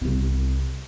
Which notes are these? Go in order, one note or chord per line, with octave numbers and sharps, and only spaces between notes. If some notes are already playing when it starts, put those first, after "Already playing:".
C2 E4